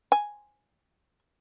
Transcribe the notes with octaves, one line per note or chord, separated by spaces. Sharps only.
G#5